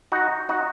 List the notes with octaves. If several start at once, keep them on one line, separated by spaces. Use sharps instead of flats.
D#4 F#4
D#4 F#4